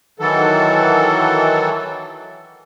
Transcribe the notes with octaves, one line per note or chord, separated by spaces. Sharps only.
D#3 E3 F#3 A4